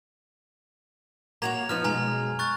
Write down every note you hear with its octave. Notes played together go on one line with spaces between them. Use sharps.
A#3 F#4 C#5 A#5 G#6 F7
F3 B3 D#4 F6
F#2 B2 G#3 G#5 A#5
C#6 F#6 A6